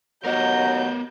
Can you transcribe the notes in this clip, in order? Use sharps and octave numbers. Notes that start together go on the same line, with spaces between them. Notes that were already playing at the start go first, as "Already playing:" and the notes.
D#2 F#3 B3 A#4 D#5 G6